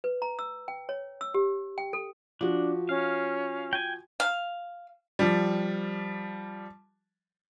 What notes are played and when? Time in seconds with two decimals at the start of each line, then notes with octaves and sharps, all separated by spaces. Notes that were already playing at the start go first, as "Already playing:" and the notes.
0.04 B4
0.22 A#5
0.39 E6
0.68 G5
0.89 C#5
1.21 E6
1.34 G4
1.78 G5
1.93 A4
2.41 F3 D4 F#4
2.89 C#4 F5
3.73 G5 G#5
4.20 F5
5.19 F3 G3